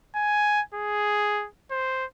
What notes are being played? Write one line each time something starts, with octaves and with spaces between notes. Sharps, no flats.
G#5
G#4
C5